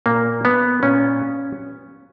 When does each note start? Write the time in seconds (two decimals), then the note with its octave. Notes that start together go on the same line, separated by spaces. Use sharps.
0.06 A#2 A#3
0.45 B3
0.83 A#2 C#4